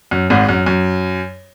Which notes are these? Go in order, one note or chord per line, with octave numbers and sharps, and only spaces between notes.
F#2
G#1 G#2
F#2
F#2